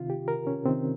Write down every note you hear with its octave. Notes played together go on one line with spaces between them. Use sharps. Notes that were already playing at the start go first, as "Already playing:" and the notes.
Already playing: C3 D#3 F4
G4
A#4
C#4
C3 D#3 C4